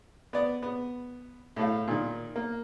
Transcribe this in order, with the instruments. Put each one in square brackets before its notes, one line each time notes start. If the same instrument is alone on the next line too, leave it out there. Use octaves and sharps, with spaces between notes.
[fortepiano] B3 D5
B3
A2 A3 F5
A#2 D#3
A#3